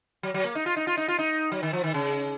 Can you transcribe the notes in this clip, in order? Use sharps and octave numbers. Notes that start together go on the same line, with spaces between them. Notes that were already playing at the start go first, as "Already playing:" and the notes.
F#3
F#3
A#3
D#4
F4
D#4
F4
D#4
F4
D#4
F#3
D#3
F3
D#3
C#3